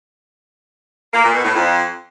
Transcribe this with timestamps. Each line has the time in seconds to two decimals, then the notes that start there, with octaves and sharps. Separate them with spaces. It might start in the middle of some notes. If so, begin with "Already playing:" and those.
1.14 A#3
1.24 A#2
1.34 B2
1.45 A2
1.55 F2